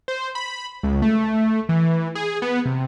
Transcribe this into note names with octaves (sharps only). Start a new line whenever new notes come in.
C5
B5
C#2
A3
E3
G#4
B3
C3